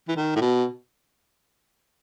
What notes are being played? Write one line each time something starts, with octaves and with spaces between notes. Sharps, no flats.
E3
D#3
A2
B2